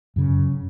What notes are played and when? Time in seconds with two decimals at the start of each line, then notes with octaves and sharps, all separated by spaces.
0.16 F#2 C#3